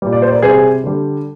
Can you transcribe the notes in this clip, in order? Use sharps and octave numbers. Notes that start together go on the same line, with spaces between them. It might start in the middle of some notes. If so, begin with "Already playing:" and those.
A#2 G3
D5
C5
A#4 D5
C3 G3 G#4 C5
D3 G3